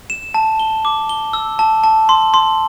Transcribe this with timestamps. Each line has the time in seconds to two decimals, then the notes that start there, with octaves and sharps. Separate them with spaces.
0.10 E7
0.34 A5
0.59 G7
0.85 D6
1.09 G7
1.33 E6
1.59 A5
1.84 A5
2.09 C6
2.34 C6